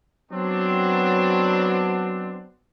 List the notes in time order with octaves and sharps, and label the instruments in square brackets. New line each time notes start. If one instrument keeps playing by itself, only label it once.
[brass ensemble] F#3 B3 C4 D4